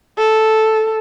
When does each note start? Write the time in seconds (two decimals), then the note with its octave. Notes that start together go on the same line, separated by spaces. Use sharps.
0.18 A4